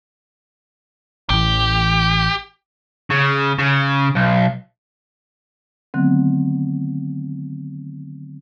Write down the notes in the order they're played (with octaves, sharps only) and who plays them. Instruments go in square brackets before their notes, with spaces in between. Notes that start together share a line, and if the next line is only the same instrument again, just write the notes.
[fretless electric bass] A1 E3 [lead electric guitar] G4
[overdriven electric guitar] C#3
C#3
B1
[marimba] D3 D#3 F#3 A3 B3 C4